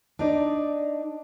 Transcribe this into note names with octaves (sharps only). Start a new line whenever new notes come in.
D4 D#4 D5